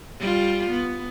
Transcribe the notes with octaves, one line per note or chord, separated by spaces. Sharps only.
G3 F4
B3